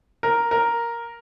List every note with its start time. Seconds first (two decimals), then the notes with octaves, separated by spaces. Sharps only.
0.23 A#4
0.51 A#4